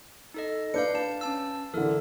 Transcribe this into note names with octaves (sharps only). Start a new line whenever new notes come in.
D#4 A4 D#5
D4 B4 F5 G6 C#7
B4 A5
C#4 A5 E6
D3 E3 A4 A#4